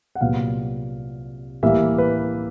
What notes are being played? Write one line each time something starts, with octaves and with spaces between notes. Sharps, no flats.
F#5
C2 A#2 F#3 B3 F5
A2 E3 G3 A#3 E5
B4